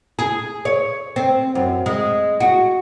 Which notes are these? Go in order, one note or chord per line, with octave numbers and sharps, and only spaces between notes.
G#4
C#5
C4
F#2
G#3
F#4